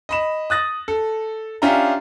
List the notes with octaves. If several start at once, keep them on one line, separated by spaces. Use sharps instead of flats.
D#5 B5 E7
D#6 F#6 A6 A#6
A4
C#4 D4 F4 G4 E5 A#5